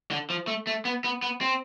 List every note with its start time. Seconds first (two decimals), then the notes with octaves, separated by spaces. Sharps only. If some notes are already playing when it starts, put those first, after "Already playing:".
0.11 D3
0.30 F3
0.47 A3
0.67 A3
0.85 B3
1.04 B3
1.23 B3
1.41 C4